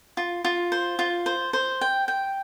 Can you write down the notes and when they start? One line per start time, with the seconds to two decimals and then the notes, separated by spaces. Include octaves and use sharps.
0.17 F4
0.44 F4
0.72 C5
0.99 F4
1.26 C5
1.53 C5
1.81 G5
2.08 G5